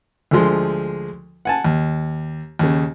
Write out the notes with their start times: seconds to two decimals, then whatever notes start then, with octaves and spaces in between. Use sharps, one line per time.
0.31 D2 D3 F3 G#3 C6
1.45 F#5 G#5 A5
1.65 D#2
2.59 D#2 C#3